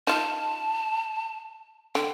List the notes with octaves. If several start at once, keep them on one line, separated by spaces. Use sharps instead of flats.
D#4 F4 A5
D3 G5